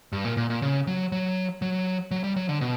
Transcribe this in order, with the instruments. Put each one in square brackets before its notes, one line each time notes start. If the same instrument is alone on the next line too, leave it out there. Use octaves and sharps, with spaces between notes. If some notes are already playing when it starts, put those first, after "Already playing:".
[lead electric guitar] G2
A#2
A#2
A#2
C#3
F#3
F#3
F#3
F#3
G3
F#3
D3
B2